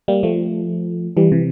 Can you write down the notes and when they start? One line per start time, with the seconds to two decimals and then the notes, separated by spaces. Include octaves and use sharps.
0.08 G3 A#3
0.23 F3 A3
1.17 E3 G3
1.32 C3 E3